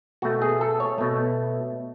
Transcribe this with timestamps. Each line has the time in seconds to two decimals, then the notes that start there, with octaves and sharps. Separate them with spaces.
0.22 B2 A3 F#4
0.42 G#4
0.61 A4
0.80 C#5
0.98 B2 A3